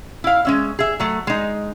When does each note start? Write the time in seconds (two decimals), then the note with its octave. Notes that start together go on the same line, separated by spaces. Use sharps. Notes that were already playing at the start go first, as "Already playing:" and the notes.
0.24 E4 F5
0.45 G#3 C#4 E5
0.79 G#4 E5
1.00 F#3 A3
1.27 G#3 D#4